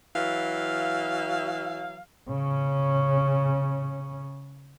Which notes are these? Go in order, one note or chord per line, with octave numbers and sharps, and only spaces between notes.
E3 F#3 F5
C#3 C#4